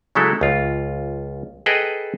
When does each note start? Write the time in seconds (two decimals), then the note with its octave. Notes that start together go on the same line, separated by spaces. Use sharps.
0.15 C#3 F#3 G#3 A3 E4 A4
0.41 C#2 F4
1.66 G#4 A4 B4 D#5 G5